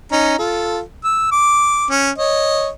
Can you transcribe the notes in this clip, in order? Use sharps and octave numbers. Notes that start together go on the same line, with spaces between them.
C#4 D#4 A#5
F4 A4
E6
D6
C#4
C#5 D#5